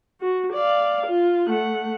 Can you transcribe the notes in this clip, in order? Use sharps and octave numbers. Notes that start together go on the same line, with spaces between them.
F#4
D5 F5
F4
A3 F#5